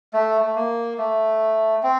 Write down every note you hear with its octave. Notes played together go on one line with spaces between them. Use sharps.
A3
A3
A#3
A3
C4